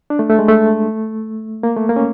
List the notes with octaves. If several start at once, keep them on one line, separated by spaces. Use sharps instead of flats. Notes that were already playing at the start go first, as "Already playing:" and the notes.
D4
A3
A3
G#3
A3
A#3
A3
A#3
C#4